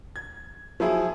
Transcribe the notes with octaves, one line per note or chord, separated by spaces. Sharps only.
G#6
F3 F#3 E4 G#4